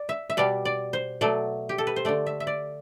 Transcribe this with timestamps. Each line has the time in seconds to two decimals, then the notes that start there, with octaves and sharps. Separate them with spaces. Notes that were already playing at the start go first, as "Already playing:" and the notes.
Already playing: D5
0.09 E5
0.30 E5
0.37 B2 G3 D5
0.65 D5
0.93 C5
1.21 B2 F#3 A3 D5
1.69 G4
1.78 A4
1.87 B4
1.96 C5
2.05 D3 A3 D5
2.26 E5
2.40 E5
2.47 D5